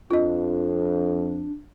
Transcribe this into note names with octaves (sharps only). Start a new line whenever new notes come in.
F2 D4 F4 D#5